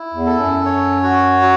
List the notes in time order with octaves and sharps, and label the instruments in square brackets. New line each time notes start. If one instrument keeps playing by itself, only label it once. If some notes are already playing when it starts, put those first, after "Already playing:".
Already playing: [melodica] E4
[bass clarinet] E2
[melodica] A4
[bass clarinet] F#2
[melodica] C#5
F#4
F#3